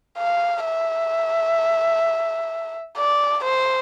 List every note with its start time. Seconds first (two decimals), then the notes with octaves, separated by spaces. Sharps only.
0.18 F5
0.66 E5
2.97 D5
3.45 C5